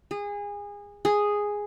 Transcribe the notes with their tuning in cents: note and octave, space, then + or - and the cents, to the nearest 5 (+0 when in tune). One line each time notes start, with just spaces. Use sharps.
G#4 -25
G#4 -5